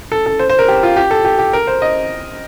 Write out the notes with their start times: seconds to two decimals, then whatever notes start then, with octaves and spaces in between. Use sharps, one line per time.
0.12 A4
0.26 A4
0.39 C5
0.50 C5
0.59 A#4
0.68 G4
0.83 F4
0.96 G4
1.11 A4
1.25 G4
1.39 G4
1.53 A#4
1.67 C5
1.82 D#5